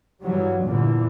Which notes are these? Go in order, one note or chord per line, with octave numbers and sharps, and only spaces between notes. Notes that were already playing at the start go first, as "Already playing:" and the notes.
G2 E3 F#3 G3
E2 G2 A#2 D3 E3